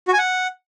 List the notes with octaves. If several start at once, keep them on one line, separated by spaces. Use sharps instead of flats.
F#4
G#5
F#5